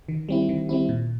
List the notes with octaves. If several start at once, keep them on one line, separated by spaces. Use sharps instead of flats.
D#3
G3 C4 E4
D#3
G3 C4 E4
A#2